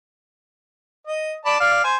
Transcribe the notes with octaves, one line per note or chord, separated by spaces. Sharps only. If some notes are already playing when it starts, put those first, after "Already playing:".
D#5
D5 A5 B5
D5 F5
C5 G#5